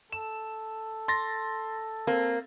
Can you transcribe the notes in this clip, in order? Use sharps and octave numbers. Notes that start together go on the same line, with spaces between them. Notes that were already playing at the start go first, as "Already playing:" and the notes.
A4 E7
C6 A6 A#6
A#3 C4